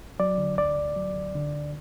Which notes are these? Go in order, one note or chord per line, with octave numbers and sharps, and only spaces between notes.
F#3 D5
D3
D2 D5
D2
F#3
D2
D3
D2